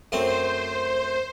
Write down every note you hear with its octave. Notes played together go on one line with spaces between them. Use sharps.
F#2 A3 C4 C5